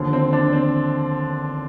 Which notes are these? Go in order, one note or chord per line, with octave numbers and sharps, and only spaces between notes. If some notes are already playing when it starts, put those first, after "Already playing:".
Already playing: D#2 D3 F3
C4
D4
C4